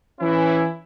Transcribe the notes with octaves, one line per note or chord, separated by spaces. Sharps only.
E3 C#4 E4